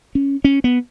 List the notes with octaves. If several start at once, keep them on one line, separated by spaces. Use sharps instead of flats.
C#4
C#4
B3